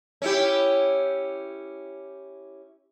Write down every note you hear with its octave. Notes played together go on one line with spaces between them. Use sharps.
C#4 E4 G4